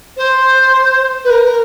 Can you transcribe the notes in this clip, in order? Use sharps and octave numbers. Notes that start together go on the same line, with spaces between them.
C5
B4
A#4